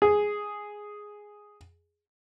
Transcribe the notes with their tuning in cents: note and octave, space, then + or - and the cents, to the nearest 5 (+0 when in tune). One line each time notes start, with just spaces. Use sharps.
G#4 +0